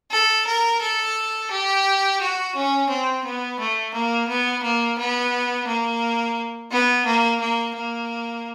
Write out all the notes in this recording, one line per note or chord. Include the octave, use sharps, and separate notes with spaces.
A4
A#4
A4
G4
F#4
C#4
C4
B3
A3
A#3
B3
A#3
B3
A#3
B3
A#3
A#3
A#3